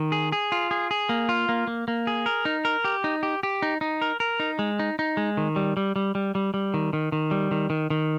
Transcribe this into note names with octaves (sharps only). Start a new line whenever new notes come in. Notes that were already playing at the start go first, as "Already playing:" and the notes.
Already playing: D#3
G#4
G#4
F4
G#4
G#4
A#3
F4
A#3
A#3
A#3
G#4
A#4
D#4
A#4
G4
D#4
G4
G4
D#4
D#4
A#4
A#4
D#4
G#3
D#4
D#4
G#3
D#3
G3
G3
G3
G3
G3
G3
D#3
D#3
D#3
G3
D#3
D#3
D#3